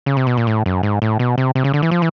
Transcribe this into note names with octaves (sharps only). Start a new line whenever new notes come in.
C#3
C3
B2
A#2
A2
F#2
G#2
A2
B2
C3
C3
C#3
D3
E3
F3
E3